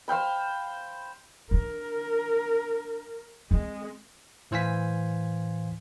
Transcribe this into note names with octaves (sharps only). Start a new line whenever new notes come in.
C5 F5 G5 B5
D4 A#4
G#3 C4
A2 E3 C5 F5 G#5 B6